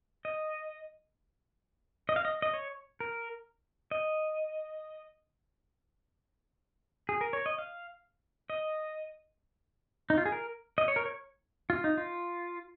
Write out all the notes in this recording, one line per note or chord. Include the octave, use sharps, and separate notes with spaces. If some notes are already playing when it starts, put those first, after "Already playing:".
D#5
D#5
F5
D#5
D#5
C#5
A#4
D#5
G#4
A#4
C#5
D#5
F5
D#5
D#4
F4
G#4
A#4
D#5
C#5
A#4
C#5
F4
D#4
F4